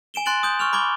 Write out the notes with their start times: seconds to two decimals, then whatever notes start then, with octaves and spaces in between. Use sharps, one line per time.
0.14 G#5 D7 E7 G7
0.26 G#5 C6 F#6 A6 D7 F#7
0.43 D#6 G6
0.59 C#6 F6 F7
0.73 B5 D6 G#6 G7